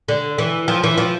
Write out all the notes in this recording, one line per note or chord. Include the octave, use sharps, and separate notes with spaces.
D3
E3
F3
E3
F3